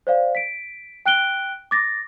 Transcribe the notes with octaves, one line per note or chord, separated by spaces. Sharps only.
C5 D5 F5
B6 D7
G5 F#6 D7 G7
D6 A6 A#6